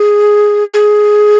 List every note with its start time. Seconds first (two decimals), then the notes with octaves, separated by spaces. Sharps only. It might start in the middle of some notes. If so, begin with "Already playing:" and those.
Already playing: G#4
0.74 G#4